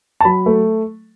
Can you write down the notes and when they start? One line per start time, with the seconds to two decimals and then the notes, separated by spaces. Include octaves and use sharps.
0.21 A5
0.25 F#3 B5
0.46 A3